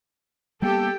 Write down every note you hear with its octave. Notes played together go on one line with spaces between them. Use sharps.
G3 A#3 B3 G4 A4 G5